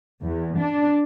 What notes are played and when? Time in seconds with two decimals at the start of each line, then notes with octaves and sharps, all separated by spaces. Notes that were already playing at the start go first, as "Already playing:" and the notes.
0.22 E2
0.58 D4